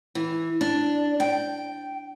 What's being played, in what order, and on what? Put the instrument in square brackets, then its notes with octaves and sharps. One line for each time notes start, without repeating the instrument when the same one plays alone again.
[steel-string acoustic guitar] E3
D4
G5